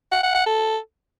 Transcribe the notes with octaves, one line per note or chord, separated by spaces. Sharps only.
F#5
F#5
F#5
A4